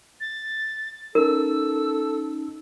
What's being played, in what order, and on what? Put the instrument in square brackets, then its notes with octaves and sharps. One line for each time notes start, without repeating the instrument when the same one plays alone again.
[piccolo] A6
[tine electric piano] C#4 D#4 [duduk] A4 [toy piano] A#4 [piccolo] E6